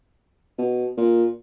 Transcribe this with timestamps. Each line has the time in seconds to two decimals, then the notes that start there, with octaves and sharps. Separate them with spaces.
0.58 B2
0.97 A#2